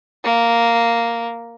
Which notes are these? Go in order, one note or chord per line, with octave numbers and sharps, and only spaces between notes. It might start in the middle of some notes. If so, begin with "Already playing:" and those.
A#3